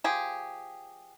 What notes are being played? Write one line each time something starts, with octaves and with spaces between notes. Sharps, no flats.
F3 G4 G#4